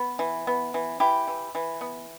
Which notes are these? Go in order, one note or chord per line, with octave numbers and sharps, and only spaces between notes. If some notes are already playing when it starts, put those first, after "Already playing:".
Already playing: B3
E3
B3
E3
E3 E4 G4
E3
E3
B3